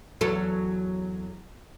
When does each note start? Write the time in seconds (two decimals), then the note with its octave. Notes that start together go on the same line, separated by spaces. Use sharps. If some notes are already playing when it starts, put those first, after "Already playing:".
0.21 E2 F#3 A4